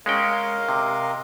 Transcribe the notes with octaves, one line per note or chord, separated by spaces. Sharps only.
G#3 C#4 A#4 D#5 F5 G5
C3